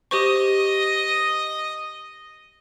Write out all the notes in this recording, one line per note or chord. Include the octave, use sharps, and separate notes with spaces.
G4 C5 D#5 C#6